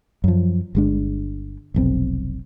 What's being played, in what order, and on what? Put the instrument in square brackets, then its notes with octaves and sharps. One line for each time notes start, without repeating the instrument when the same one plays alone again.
[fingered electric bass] F#2 F3
G1 G#3 D4
F1 B1 C4